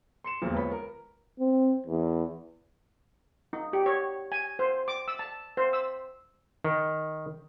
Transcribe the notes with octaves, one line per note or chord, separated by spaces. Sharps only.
C6 C#7 E7
E1 B1 F2 A#2 D3
C#2 B3 C#5 B5
A#4
C4
E2
D#4
G4
C#5
G#5
C5
D6
E6
A5
C5
E6
D#3